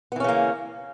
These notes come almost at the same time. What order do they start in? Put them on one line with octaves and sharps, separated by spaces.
B3 E3 C#4 C#3 A#3